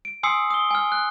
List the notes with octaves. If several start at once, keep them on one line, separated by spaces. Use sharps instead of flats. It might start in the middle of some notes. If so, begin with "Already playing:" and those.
D7
G#5 C6 D#6 E6 C7 C#7
D#6 G7
G#5 F6
F#6